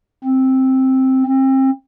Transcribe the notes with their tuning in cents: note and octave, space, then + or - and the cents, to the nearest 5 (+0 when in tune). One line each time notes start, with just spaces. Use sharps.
C4 +5
C4 +30